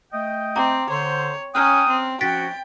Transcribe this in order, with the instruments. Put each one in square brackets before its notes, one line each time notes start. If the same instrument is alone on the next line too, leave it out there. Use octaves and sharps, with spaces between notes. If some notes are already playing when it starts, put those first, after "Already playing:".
[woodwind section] A3 D#5 G5
[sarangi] C4 [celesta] A#5 D6
[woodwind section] D3 C5 [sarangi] C#5
[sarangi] C#4 [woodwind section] G5 D#6 [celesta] A#5 F6 F#6
[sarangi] C4
[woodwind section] F3 C#4 F#4 [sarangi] G5 [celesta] A6 B6 D7